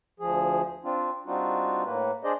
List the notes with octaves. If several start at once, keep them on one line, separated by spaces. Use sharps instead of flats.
D2 F3 G#4
C4 D4 F4
G3 C4 D4 D#4 F4 F#4
A2 A#3 B4
D4 G#4 C5 D5 D#5